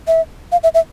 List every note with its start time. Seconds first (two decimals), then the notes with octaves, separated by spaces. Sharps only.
0.07 E5
0.52 F5
0.63 E5
0.74 E5